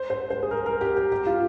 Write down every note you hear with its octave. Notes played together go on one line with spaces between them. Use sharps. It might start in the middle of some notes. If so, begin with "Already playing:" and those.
Already playing: C5
C5
C5
G#4
A#4
A#4
G4
G4
G4
F4